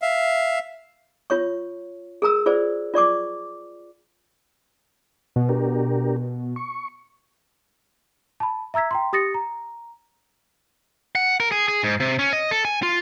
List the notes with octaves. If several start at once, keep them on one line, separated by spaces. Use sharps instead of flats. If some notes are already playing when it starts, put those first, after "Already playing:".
E5 F5
F4 C#5 C#6
G#4 A#4 A#5 E6
F4 G#4 C5 D5
F4 D5 C#6 D6
B2
D4 G4 A#4
C#6
A5 B5
E5 A#5 E6 G#6 B6
G5 A#5 C6
G4 D#6 A6 A#6 C#7
A#5
F#5
A#4
G#4
G#4
G#2
C3
C#4
D#5
A4
G#5
F4